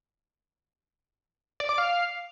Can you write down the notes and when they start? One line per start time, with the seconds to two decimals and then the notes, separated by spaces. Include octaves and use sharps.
1.60 D5
1.69 D6
1.78 F5